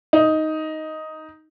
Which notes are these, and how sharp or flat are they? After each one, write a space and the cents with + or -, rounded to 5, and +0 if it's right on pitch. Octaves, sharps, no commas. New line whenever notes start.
D#4 +5